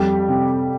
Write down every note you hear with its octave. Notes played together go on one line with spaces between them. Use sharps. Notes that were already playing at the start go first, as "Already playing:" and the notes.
Already playing: F2 G3 G4
C3